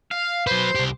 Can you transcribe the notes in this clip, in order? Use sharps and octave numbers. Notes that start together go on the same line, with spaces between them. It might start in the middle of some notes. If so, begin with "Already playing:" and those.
F5
F#3 B4 C5
C2 G4